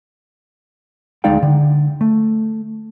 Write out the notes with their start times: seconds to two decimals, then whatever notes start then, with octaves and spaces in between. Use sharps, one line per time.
1.24 D2 G#3 D#4 D5 F5 G5
1.43 D3
2.01 A3